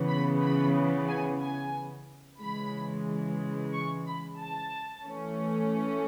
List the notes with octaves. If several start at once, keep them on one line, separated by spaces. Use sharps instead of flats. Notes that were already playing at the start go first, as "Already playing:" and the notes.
Already playing: C#3 E3 B3
B5
B5
G#5
G#5
C#3 E3 G#3 B5
C#6
B5
A5
E3 A3 C#4